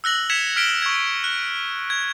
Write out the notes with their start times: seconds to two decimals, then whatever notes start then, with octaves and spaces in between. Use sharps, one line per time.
0.04 E6 F#6 A#6 F#7
0.30 G#6 B6 C#7 E7 F7
0.56 F6 B6 D7 G7
0.82 C#6 G#6
1.24 F#6
1.90 G#6